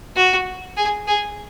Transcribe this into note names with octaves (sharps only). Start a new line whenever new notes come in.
F#4
G#4
G#4